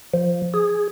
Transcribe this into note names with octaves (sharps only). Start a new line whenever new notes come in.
F3
G#4